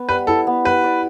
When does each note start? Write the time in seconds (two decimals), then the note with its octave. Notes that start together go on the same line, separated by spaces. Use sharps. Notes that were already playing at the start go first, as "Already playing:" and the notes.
Already playing: B3
0.09 G3 B4
0.27 E4 A4
0.47 B3
0.65 G4 B4
0.84 D5